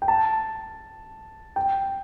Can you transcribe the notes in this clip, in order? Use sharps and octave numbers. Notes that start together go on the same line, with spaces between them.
G5
A5
G5